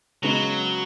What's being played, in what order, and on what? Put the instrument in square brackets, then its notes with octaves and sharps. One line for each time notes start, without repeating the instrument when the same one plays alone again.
[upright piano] C#3 G#3 B3 [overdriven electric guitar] F#3